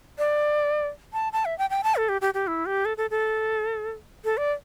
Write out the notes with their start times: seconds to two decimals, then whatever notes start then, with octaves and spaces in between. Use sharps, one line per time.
0.18 D5
1.13 A5
1.33 A5
1.45 E5
1.58 G5
1.70 G5
1.84 A5
1.96 A4
2.09 G4
2.21 G4
2.34 G4
2.47 E4
2.66 G4
2.85 A4
2.97 A4
3.10 A4
4.24 A4
4.37 D5